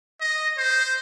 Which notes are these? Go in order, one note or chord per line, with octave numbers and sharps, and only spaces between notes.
D#5
C5